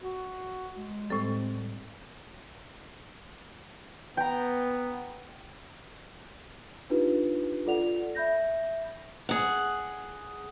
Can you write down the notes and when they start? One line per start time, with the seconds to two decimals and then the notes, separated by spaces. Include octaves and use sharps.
0.02 F#4
0.76 G#3
1.10 A2 G3 C4 A4
4.17 B3 G5 A#5
6.90 D4 D#4 F4 G4 B4
7.66 F4 A4 D5 F#5 F7
8.15 E5 B5 G6 A#6
9.29 G#4 F#5